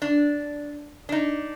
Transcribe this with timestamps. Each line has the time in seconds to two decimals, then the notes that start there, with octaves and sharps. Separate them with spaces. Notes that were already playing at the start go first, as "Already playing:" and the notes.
0.02 D4
1.09 D4 D#4